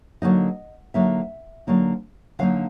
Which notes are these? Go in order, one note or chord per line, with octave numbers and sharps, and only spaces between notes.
D3 F#3 A#3 D#4 D#5
D3 F#3 A#3 D#4 E5
D3 F#3 A#3 D#4
D3 F#3 A#3 D#4 F5